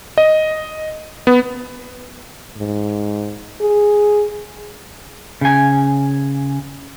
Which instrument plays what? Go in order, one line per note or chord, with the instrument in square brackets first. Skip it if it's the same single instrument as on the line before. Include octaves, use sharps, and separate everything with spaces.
[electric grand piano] D#5
B3
[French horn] G#2
G#4
[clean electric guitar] C#3 G#5